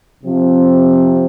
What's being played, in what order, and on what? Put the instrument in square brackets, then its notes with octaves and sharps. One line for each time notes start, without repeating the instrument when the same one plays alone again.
[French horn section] C3 F3 C4